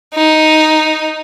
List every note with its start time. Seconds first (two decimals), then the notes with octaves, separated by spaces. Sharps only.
0.14 D#4